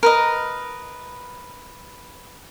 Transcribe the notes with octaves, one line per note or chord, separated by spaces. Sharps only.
A#4 B4 D#5